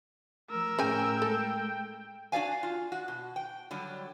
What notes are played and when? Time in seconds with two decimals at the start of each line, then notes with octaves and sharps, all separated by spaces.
0.50 F3 A3 A#4 E6
0.79 A2 C#3 G5 G#5
1.22 G#3 A4
2.32 D4 F#4 A4 D5 F5 G#5
2.63 F4
2.92 F#4
3.08 B2
3.36 G5
3.71 D3 F#3 G3